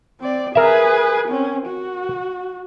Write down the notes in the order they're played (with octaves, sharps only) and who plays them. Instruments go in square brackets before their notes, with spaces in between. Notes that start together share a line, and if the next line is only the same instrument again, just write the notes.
[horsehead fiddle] C4 D5
[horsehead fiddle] G#4 B4 [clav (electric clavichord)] A#4 E5
[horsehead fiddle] C4 C#4
F#4